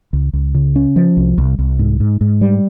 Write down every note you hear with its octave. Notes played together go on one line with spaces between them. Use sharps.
C#2
C#2
C#3
C#4
F3
C2
C2
C2
G#2
G#2
G#2
G3